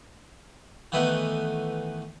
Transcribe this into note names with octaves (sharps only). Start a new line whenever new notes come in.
D#3 E3 A3 B3